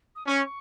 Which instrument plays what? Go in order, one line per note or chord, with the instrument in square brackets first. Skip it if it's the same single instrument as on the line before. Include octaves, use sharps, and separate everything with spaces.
[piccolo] D#6
[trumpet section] C#4 [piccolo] C#6